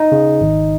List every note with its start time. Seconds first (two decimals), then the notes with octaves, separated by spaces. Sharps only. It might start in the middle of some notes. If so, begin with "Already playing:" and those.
Already playing: D#4
0.12 C#3
0.41 G#1